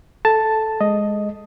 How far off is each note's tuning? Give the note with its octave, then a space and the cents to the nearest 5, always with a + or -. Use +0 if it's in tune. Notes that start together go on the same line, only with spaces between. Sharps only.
A4 -10 A5 +0
G#3 +0 D#5 +0